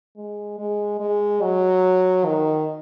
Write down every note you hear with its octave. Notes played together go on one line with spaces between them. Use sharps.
G#3
G#3
G#3
F#3
D#3